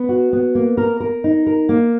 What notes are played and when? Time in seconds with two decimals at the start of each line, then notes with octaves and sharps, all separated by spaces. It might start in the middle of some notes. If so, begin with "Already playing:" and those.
Already playing: B3
0.09 F#4
0.33 B3
0.55 A#3
0.77 A#4
1.00 A#4
1.24 D#4
1.46 A#4
1.69 A#3